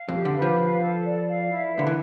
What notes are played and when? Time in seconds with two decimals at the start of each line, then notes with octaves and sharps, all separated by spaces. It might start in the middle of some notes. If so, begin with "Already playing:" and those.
Already playing: F5
0.08 F2
0.14 G4
0.25 D3
0.36 B4
0.42 F3
0.59 F5
0.82 A4
1.04 D5
1.28 F5
1.50 E4
1.73 B4
1.79 D3
1.87 E3